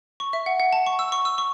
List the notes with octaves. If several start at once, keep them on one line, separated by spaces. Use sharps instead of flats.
C#6
E5
F#5
F#5
A5
C#6
E6
C#6
E6
C#6